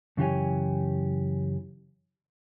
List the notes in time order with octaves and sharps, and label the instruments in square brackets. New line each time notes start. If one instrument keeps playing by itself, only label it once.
[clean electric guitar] F#2 C#3 E3 G4 C#5 G#5